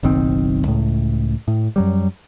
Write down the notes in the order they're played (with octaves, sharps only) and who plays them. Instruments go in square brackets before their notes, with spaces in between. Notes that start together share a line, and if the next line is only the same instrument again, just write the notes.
[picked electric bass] F#1 B1 D#3 C4
C#2 A2
A2
F#2 F#3 G3